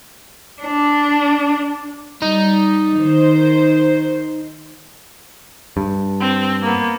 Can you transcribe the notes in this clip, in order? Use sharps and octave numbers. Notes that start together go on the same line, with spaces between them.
D4
G3 D#4
D#3 C5
G2
C4
A#3 B3